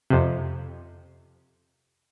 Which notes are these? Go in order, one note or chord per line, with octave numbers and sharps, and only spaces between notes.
F2 C3